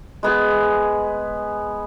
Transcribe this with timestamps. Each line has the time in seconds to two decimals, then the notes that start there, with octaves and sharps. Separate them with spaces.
0.23 G#3 B3 G#4